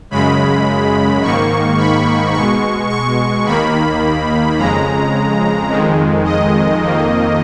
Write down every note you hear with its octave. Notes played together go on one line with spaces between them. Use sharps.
F#2 C#3 G#3 B5
G#2 D#3 A#3 C#6
B5
B2 G#3 C#6
C#6
D#2 D#3 A#3 B5
F2 C#3 G#3 A#5
F2 D#3 G#3
D#5
F2 D#3 A#3